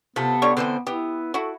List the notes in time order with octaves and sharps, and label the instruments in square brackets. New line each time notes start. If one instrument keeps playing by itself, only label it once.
[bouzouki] C3 A3 A4 [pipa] F3 [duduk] B3
[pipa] D3 G3 C#5
[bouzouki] D3 C5 [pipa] E3 C4
[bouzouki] B3 [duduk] E4 [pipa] G4
[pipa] E4 F#4 [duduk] A4